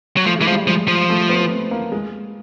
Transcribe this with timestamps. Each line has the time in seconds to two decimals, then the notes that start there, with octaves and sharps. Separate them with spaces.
0.17 F#3
0.26 F3 A3
0.39 E3 G#3
0.47 F3
0.52 G3
0.66 F3 G#3
0.88 F3
1.10 A3
1.29 B3
1.50 C4
1.71 A#3
1.92 G#3